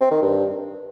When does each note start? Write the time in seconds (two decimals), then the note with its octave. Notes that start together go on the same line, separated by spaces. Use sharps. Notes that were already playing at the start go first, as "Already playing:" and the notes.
0.01 C4
0.11 D#3
0.22 G2